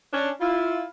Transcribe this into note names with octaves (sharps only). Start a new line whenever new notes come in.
C#4 D4
E4 F4